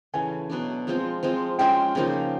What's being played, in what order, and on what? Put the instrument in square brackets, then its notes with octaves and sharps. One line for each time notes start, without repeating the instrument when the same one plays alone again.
[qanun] C#3 E3 A3 [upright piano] G#5
[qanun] B2 F#3 B3 D4
F3 G#3 C4 F4
F3 G#3 C4 F4
[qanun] G#3 C#4 F4 G#4 [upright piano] G5
[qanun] C#3 F3 A#3 D#4